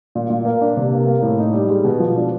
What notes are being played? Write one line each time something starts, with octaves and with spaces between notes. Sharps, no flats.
A#2
A#2
A#3
D4
C3
A#3
A#3
A2
D#4
G3
G#3
B2
F3
D4